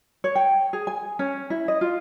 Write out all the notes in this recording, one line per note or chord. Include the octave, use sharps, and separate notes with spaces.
C#5
G5
G#4
G#5
C#4
E4
D#5
F4